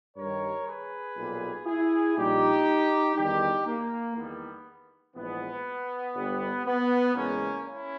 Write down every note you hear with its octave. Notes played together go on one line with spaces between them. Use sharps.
G2 D#3 G3 A#4 C#5
G#4 B4
B1 A#2 G3
E4 G#4
A#1 A#2 G3 D#4 G4
E2 D#3 G3 D#4 G4
A#3
E2 D#3 G3 B3
A#1 G#2 E3 B3
G1 G2 G3
B3
E2 C#3 G#3 A#3 C#4
C#4 E4